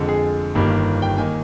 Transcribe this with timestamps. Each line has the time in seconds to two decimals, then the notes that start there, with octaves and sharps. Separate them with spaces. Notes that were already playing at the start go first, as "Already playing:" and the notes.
Already playing: F2 D3 G#3
0.09 G#4
0.55 G1 G2 D#3 G3 A#3
1.02 G5
1.18 D#3 A#3 G#5